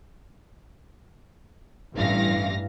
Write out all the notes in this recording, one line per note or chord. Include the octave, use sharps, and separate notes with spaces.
A1 G2 E3 F5 A#6